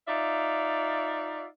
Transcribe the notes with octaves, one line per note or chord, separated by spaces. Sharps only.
D#4 F4 D5 E5